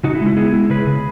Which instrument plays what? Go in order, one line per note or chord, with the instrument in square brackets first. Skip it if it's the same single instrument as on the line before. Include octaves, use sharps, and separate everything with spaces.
[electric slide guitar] C#3 D#4 F#4
E4
G#3
E4
B3 E4 G#4
G#3 E4
C#3 G#4 B4
C#3